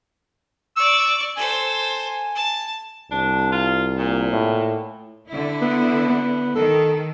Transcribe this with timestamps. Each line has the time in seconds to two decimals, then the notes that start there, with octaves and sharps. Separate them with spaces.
0.77 D5 C#6 E6
1.37 A4 C5 G#5
2.35 A5
3.11 C2 D4
3.52 F4
3.98 A#2
4.32 A2
5.28 D3 E4
5.62 B3
6.10 B3
6.56 D#3 A4